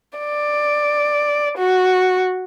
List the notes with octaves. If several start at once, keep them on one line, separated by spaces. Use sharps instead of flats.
D5
F#4